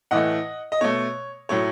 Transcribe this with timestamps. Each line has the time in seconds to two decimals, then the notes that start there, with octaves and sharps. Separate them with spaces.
0.11 A2 E3 A3 D#5 F#5
0.72 D#5
0.81 B2 A3 C#5
1.49 A2 F#3 A3 C#5